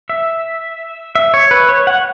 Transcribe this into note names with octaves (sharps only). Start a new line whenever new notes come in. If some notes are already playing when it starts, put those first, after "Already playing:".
E5
E5
C#5
B4
C#5
F#5